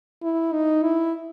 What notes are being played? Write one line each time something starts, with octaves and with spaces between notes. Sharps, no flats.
E4
D#4
E4